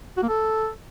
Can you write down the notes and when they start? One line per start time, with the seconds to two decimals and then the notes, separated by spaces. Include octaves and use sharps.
0.17 F#4
0.23 A#3
0.28 A4